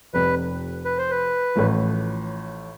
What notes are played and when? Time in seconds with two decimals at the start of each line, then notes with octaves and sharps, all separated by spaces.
0.14 F1 F2 C3 B4
0.85 B4
0.98 C5
1.10 B4
1.55 A1 A2 F3